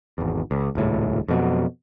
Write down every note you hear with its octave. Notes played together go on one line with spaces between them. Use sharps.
G#1 E2
C#2
D#1 C#2 A2
F2 B2 F#3